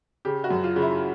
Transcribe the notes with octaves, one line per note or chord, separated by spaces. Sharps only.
C#3 G4
F#4
F#2
F4
C#3
E4